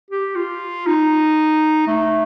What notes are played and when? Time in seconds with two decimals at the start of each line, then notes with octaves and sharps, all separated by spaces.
0.10 G4
0.36 F4
0.86 D#4
1.87 A3